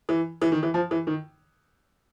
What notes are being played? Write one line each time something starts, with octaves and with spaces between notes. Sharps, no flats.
E3
E3
D#3
E3
F3
E3
D#3